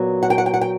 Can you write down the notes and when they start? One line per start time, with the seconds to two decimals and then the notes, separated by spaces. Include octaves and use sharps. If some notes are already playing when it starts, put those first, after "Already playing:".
Already playing: A#2 F#3 B3
0.23 F#5
0.30 G5
0.38 F#5
0.46 G5
0.54 F#5
0.61 G5